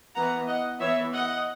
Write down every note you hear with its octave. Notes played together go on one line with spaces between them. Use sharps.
E3 B3 F#5 A#5
D#5 F#5
E3 B3 C#5 E5
D#5 F#5